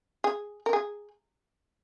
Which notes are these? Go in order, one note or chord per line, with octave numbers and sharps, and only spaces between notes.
G#4
A#4
G#4